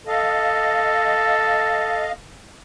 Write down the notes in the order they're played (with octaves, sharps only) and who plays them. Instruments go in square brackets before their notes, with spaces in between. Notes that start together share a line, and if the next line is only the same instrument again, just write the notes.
[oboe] A4 [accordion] D#5 F5